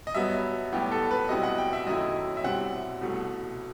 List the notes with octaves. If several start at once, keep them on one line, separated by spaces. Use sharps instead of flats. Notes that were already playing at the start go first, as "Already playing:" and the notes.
D#5
G2 F#3 B3 E5
B1 A2 G3 B3 G4
A4
B4
B1 B2 G3 C4 E4 D#5
F#5
G5
E5
F#2 D#3 F#3 A3 E4 D#5
E5
C2 B2 G3 C4 F#5
C2 B2 A3